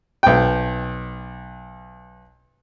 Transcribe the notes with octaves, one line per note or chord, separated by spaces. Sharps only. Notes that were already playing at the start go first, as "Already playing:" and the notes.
B1 G5